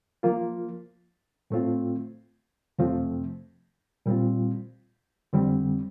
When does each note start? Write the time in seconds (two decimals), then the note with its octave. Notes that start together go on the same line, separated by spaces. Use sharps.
0.23 F3 A#3 F4
1.50 A2 A3 C4 F4
2.79 F2 C3 F3 A3 C4
4.06 A#2 G3 C4 F4
5.33 F2 D3 G3 C4